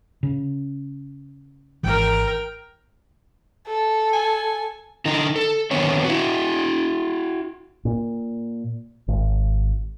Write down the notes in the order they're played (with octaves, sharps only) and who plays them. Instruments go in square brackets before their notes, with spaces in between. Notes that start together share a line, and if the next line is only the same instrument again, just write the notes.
[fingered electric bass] C#3
[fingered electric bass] G#1 E3 [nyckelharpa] A#4 G5
[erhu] A4
[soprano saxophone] G#5
[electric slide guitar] D3 D#4
A4
D3 D#3 B3 C4 C#5
E4 F#4
[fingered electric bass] A#2
G#1